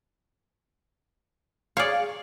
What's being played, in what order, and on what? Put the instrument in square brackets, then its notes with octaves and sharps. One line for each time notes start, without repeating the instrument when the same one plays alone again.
[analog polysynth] G#4 F5 [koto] C#5 D5